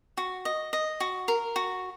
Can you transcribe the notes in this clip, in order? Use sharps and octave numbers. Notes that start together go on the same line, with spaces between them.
F#4
D#5
D#5
F#4
A#4
F#4